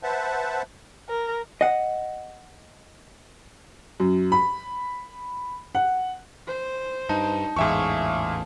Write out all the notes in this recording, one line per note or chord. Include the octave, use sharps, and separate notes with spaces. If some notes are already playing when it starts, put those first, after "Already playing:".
B4 C5 E5 F#5 A5
A#4
D#5 F#5
F#2
B5
F#5
C5
G2 D#4 A5
A1 E2 G#2 G#4 E5 F5 C#6